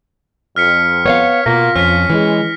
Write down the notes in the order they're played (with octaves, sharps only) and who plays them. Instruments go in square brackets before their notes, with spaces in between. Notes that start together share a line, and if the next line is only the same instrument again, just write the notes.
[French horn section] F2 [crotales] F6 B6 C#7
[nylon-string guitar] B3 D#5 F5 [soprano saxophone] C#5
[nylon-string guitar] B2 [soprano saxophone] A#3 [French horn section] F4 [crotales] A#6
[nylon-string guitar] F2 [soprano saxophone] C#4 [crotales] F6 B6
[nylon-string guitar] E3 [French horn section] G#3